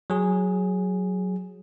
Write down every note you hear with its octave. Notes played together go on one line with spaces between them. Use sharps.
F#3 G#4